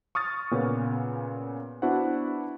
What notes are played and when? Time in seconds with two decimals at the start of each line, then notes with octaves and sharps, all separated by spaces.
0.15 C#6 D#6 F6 A6
0.51 A#2 C#3 B3 C#4
1.82 B3 D4 E4 F#4 C5 F#5